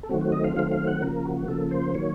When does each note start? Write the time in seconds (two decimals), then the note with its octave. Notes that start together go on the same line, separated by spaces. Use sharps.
0.03 A4
0.09 D#3 F#3 A3 C4 F#4
0.21 F#4
0.32 D#5
0.44 F5
0.56 D#3 F#3 A3 C4 F5
0.71 F5
0.87 F#5
1.02 C#3 F3 A#3 A#4
1.25 F#4
1.48 C#3 F3 A#3 A4
1.71 C5
1.95 D#3 F#3 A#3 C#5